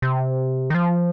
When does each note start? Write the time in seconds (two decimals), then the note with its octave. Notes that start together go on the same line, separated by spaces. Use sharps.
0.02 C3
0.70 D#3
0.75 F3